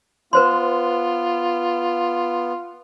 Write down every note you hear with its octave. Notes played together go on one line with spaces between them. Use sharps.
B3 F4 B4 C5 C6